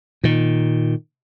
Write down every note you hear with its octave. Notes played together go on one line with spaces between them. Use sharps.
A#2 D#3